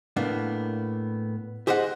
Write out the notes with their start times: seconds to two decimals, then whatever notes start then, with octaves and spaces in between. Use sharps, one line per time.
0.16 A2 A#3 B3 D4
1.67 G4 G#4 C5 D#5 E5 F#5